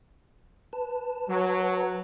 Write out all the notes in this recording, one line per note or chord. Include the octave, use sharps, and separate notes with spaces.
B4 A5
F#3